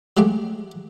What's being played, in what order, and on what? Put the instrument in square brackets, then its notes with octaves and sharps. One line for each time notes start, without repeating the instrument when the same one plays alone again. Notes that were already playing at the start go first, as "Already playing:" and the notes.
[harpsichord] F#3 G#3 A3 G4